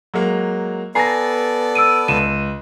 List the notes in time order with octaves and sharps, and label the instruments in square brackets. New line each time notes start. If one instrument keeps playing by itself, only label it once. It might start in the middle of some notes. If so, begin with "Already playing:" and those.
[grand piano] F#3 G#3 A#3
[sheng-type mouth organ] B3 A4 D5 [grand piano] G#5 A#5 [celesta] A#6 C7
[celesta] E6 D7 D#7
[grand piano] C#2 [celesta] D#7 E7